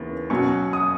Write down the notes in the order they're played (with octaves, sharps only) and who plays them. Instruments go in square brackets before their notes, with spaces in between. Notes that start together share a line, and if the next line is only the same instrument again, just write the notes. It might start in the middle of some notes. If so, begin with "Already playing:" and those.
Already playing: [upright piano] D#2 C#3 E3 B3
B2 F#3 C#4 C#6
D#6